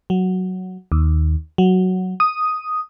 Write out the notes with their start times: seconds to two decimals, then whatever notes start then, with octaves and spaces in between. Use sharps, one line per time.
0.10 F#3
0.92 D#2
1.58 F#3
2.20 D#6